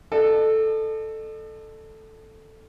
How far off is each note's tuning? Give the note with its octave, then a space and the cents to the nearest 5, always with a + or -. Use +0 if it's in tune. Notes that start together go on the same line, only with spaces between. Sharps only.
A4 +0 D#5 -45